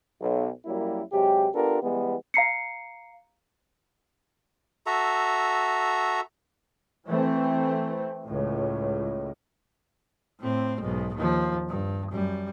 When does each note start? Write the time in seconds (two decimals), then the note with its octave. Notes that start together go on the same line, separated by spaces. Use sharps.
0.21 B1
0.66 F#2 F#3 G3 A#3 E4
1.13 C3 F#3 G#3 G4
1.54 B3 D4 F4 G4 A4 A#4
1.83 E3 G3 G#3 B3
2.34 F5 A#5 C7 C#7
4.86 F#4 A4 E5 A#5
7.07 E3 A3 C4
8.25 C#2 A2
10.40 A2 C4
10.80 B1 G#2
11.16 D#2 F3
11.68 G2
12.11 F#2 G3